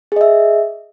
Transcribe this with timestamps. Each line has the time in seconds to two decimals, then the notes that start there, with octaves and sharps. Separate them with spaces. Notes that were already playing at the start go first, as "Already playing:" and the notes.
0.12 G#4
0.16 D#5
0.21 E5